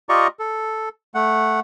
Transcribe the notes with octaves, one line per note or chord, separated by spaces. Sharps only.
F4 G4 D5 D#5 A#5 C#6
A4
A3 F#5